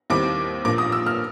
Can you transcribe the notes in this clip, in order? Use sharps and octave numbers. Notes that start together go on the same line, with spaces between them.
D#2 D#3 G3 C4 E4 D6
A#1 A#2 F3 A#3 D6
D#6
E6
F6